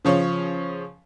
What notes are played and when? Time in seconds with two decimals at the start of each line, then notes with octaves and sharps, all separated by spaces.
0.05 C#3 F3 C#5